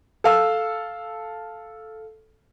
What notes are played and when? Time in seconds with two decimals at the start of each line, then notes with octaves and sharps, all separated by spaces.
0.24 A4 F5 E6